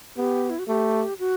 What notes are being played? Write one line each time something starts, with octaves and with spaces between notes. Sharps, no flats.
B3 G4
E4
F#4
A3 G4
F#4